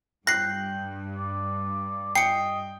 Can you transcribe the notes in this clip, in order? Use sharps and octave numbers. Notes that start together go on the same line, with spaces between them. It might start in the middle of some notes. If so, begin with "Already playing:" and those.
G2 G5 F#6 A#6 C7
D5
D#5 G5 C7 C#7